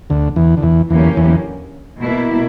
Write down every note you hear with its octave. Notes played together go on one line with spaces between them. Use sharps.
D2 D3
E2 E3
D3
E2 E3
E2 D3 E3 F#3 A#3 C#4 G4
E2 E3
B2 A#3 E4